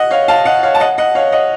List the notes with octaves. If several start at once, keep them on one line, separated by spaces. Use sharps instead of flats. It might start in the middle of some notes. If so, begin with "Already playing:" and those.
Already playing: D#5 F#5
C#5 F5
F5 A5
D#5 F#5
C#5 F5
A5
D#5 F#5
D#5 F#5
C#5 F5
D#5 F#5